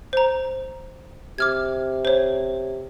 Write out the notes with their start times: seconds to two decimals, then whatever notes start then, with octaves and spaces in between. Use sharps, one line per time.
0.13 C5 A#5
1.38 C3 D6 F6 G#6
2.05 C5 C#5